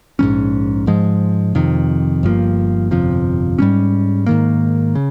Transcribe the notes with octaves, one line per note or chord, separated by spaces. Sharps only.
A#1 G#2 G3 C#4
G#2 F3 G#3
F2 C3 D#3
G1 G2 F3 A#3
G1 F2 C3 F3
G#2 G3 A#3 C#4
G#2 D#3 A#3
C#3